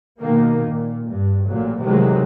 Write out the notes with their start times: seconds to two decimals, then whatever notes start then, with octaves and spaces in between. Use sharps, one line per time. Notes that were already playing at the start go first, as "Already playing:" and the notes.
0.20 B2 D#3 A#3
0.68 A#2
1.10 G2
1.45 A1 A#2 F#3
1.80 C3 D#3 E3 F#3 G#3